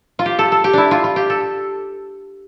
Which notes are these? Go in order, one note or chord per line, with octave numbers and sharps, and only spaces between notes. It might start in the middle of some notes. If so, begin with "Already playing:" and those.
F4
G4
A4
A4
G4
D4 E4
F4
F4
G4
A4